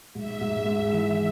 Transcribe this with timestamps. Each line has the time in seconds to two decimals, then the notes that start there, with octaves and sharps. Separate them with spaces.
0.15 G#2 E5
0.41 G#2
0.66 G#3
0.92 E3